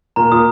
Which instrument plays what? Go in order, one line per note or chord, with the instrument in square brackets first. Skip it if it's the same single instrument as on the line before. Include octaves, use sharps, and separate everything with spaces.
[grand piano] A#2 [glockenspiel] A#5
[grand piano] A#2 [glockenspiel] D#6